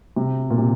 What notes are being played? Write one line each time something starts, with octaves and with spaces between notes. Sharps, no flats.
C3
A#2
C3